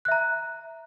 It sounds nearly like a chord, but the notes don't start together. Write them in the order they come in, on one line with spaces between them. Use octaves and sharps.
F#6 E5 A#5